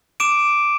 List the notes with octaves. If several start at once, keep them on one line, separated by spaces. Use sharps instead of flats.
D6 D7 E7